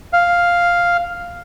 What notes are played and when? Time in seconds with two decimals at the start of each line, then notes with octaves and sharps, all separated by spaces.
0.13 F5